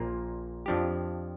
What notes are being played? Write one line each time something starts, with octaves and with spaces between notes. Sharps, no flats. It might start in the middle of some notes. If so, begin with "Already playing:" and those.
Already playing: A#1 A#2 A#3 F4
F2 F3 D4 G4